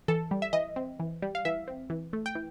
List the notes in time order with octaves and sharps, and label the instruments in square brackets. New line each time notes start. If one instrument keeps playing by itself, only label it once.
[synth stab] E3 A4
G3
E5
E3 D#5
C4
E3
G3
F5
E3 E5
C4
E3
A3
G5
E3